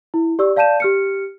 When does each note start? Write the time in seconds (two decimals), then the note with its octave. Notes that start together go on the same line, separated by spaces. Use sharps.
0.14 E4
0.39 G4 D5 C#6 E6
0.56 D5 F5 A5 G6 D#7 E7
0.80 G4 F6 C#7